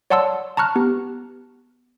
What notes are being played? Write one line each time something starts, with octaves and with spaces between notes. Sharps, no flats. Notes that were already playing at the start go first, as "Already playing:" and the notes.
C#5 D5 F#5 A5 C6 E6
A5 A#5 C#6 F6 F#6
B3 G4